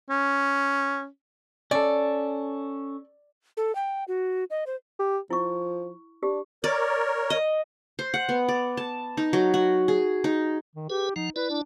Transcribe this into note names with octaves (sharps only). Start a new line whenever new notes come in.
C#4
C#4 A4 D5
A4
G5
F#4
D#5
C5
G4
F3 E4 C#6
D4 G4
A#4 C#5 D5
D#5
C5
F#5
B3
D5
A5
D#4
F#3
F#4
G#4
D#4
D#3
G4 G#4 B4
F3 D#4 F#5
E4 B4 D5
D4